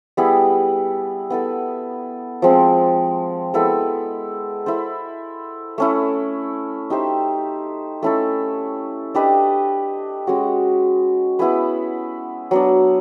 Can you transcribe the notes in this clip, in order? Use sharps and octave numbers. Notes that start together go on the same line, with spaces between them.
G3 B3 E4 G#4
B3 E4 A4
F3 G#3 C4
G#3 B3 E4 A4
E4 A4 C5
A3 C#4 E4
D#4 G4 C5 E5
A3 C#4 E4 A4
D4 G4 B4 D#5
G#3 C#4 F#4
B3 E4 G#4 B4
F#3 B3 D4